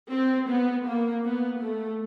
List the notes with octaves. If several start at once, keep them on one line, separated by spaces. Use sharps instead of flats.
C4
B3
A#3
B3
A3